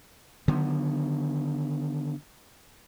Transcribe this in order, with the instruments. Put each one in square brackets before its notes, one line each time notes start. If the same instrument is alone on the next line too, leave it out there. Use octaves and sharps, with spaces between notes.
[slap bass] D3 D#3 F#3 B3